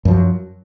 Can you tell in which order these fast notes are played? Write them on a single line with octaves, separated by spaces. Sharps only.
F#2 F3 F#3